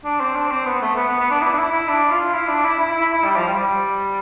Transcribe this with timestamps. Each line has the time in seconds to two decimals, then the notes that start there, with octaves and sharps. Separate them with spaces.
0.05 D4
0.20 C4
0.36 D4
0.51 C4
0.66 B3
0.82 A3
0.96 B3
1.08 B3
1.20 B3
1.30 D4
1.42 E4
1.53 D4
1.58 E4
1.72 E4
1.88 D4
2.11 F4
2.34 E4
2.48 D4
2.64 E4
2.80 E4
2.91 E4
3.01 E4
3.14 E4
3.24 G3
3.37 F3
3.47 G3
3.59 G3